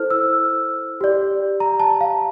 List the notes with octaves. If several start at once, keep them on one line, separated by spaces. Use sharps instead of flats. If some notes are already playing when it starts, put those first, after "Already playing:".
Already playing: E4 A4 C5 F6
E6
G4 D5
A#5
A5
F5